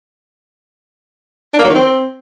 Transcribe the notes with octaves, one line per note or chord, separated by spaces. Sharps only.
D4
A#3
F#3
D#3
C4